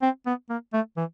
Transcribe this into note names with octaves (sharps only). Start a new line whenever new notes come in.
C4
B3
A#3
A3
E3